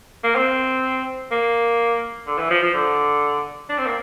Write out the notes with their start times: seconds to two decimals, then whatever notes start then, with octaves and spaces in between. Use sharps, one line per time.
0.24 A#3
0.36 C4
1.31 A#3
2.27 D3
2.38 E3
2.50 F3
2.62 F3
2.74 D3
3.69 D4
3.78 C4
3.87 A#3